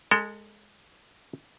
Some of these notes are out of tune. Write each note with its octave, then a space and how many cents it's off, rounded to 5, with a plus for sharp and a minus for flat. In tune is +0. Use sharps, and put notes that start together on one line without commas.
G#3 +0 A4 +30